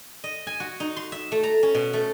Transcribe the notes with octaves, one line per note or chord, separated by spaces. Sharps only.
D#5
G#5
F#4
D#4
C6
E5
A3
A#5
C#4
B2
A3